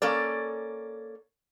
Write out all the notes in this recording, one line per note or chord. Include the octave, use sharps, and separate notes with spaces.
A#3 C#4 A4 D5